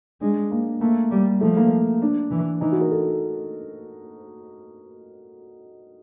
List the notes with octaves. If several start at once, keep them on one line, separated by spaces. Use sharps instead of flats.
G#3 D4
A#3
A3 A#3
G3
F3 A3
A#3
D4
E3
E3 D#4
F#4
A#4
A4